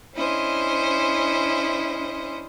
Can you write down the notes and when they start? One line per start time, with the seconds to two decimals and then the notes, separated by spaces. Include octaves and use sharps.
0.16 C#4 D4 E4 C5 D#5